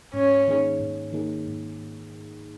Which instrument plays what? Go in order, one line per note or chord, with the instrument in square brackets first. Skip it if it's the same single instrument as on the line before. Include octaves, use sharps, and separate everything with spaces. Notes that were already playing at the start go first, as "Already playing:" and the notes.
[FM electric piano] G#2 [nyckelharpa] C#4
[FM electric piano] D#3 A#3 D#4 G#4
G#2
D#3 A#3 D#4 G#4
G#2